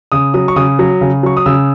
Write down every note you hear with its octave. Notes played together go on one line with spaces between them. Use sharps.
C#3 D#6
F#3 D#6
C#6
C#3 D#6
F#3
C#3
F#3 C#6
D#6
C#3 E6